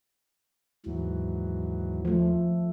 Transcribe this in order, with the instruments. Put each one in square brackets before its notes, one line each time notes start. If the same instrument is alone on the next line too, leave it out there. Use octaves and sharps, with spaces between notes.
[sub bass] D#2 [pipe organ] G#2 E3 F#3
[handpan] F3 A3